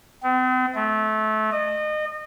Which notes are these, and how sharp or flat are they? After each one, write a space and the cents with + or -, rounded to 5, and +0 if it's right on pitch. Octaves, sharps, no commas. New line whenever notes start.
C4 -45
A3 -25
D#5 -30